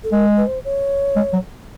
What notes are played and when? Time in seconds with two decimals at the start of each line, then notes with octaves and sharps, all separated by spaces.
0.04 A4
0.12 G#3 A#4
0.37 B4
0.47 C5
0.65 C#5
1.16 G#3
1.33 F#3